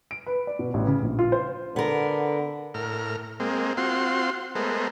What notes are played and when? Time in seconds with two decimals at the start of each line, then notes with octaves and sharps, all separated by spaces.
0.11 D7
0.26 B4
0.47 D5
0.59 B2
0.74 A1
0.87 C#3
1.03 A#1
1.19 F4
1.32 C5
1.76 D3 B3 A#4
2.74 A2 A#4 F6
3.40 G#3 A#3 C4
3.77 C4 F4 F#4 C6
4.55 G#3 A3 B3 A#4 C5